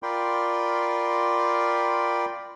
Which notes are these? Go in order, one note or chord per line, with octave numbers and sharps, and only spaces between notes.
F4 A#4 D5 G5 B5 C6